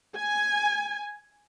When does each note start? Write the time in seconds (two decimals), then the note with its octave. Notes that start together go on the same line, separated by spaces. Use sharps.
0.15 G#5